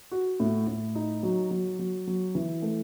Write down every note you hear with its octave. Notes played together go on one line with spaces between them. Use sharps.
F#4
A2
A2
D#4
F#3
F#3
F#3
F#3
E3
A3